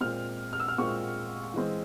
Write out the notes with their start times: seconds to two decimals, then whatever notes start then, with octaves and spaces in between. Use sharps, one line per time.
0.01 A#2 G#3 C4 F6
0.53 F6
0.60 E6
0.68 F6
0.78 A#2 G#3 C4 C#6
1.54 E3 G#3 C4